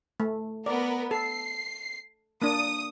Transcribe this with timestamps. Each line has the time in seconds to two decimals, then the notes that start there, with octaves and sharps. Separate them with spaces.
0.20 A3
0.66 B3 A#4 D5
1.11 A4 C7
2.42 A#3 D4 D#6